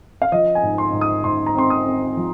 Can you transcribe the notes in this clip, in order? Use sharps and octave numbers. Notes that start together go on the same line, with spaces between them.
F5
F3 D#5
G#5
G#2
C6
G#2
D#6
G#2 C6
A#5
C4 C6
D#6
C4
F3